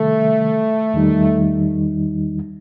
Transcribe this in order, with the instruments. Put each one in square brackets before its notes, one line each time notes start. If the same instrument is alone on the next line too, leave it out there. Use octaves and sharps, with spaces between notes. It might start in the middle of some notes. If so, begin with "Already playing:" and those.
Already playing: [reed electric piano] C3 D#3 G3 [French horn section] A3
[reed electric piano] E2 D#3 G3 D#4